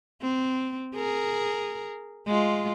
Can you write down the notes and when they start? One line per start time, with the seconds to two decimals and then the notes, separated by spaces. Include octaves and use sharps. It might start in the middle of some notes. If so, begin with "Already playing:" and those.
0.22 C4
0.96 G#4 A#4
2.28 G#3 F4